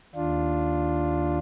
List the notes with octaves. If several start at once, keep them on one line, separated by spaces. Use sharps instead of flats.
D#2 D4 F4